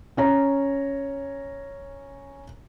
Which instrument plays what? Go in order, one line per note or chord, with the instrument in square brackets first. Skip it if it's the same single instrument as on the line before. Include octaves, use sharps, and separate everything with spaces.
[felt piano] C#4 C#5 A#5